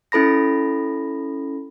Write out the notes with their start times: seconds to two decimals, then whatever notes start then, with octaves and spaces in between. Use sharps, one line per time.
0.12 C#4 E4 A4 B5 A#6